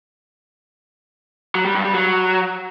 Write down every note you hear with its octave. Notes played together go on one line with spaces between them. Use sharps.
F#3
G3
G2
G3
F#3